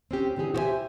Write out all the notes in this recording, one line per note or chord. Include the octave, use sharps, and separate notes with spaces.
C4 C#4 G4
D3 E3 C4 G4 G#4
F#4 G4 C5 C#5 E5 G#5